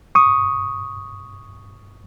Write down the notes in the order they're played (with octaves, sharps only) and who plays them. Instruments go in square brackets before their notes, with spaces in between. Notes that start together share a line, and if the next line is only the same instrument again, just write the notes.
[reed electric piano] C#6 D#6